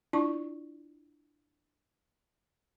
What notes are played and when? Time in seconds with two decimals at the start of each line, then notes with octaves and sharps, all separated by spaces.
0.13 D4 E4 F4 D5 A5 C#6